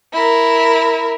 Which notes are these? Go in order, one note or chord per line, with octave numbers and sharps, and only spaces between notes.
E4 A#4